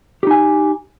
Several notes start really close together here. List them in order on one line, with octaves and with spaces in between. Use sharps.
G4 D#4 G#5